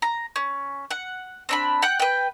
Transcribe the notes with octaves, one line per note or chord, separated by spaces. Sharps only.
A#5
C#4
F#5
C4 D4 B5
F#5 G5
B4 G5